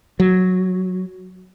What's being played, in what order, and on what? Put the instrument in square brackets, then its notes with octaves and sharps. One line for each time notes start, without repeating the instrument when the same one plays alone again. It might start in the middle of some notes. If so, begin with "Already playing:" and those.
[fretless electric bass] F#3